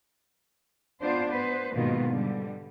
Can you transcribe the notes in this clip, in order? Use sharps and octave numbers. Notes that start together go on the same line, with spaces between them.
B3 D4 F4 C5
B3 B4 C5
G#2 B2 D#3 A#3 B3 F4
D3 G3